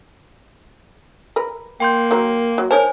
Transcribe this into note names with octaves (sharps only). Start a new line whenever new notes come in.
A#4 B4
A#3 G5 C6 G6
D#3 F#3 A#4
F#3
D#4 A#4 C5 C#5 G#5 A5